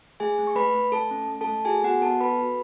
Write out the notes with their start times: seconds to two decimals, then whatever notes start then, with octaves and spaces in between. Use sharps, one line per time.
0.20 A3 G#4 G#5
0.38 A3
0.47 C#6
0.56 A3 B4 B5
0.75 A3
0.92 A3 A4 A5
1.11 C#4
1.29 A3
1.41 A4 A5
1.47 A3
1.65 F#4 G#4 G#5
1.83 B3 F#4 F#5
2.02 B3 A4 A5
2.20 A4 B4 B5
2.39 F#4